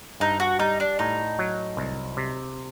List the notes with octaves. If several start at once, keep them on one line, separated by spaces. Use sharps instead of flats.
G2 D#4
F#4
G3 D#4
D4
A2 D#4
F#3
C2
C3